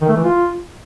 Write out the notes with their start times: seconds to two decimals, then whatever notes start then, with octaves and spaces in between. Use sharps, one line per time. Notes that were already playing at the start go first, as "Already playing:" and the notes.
0.01 D#3
0.09 A3
0.16 E3
0.24 F4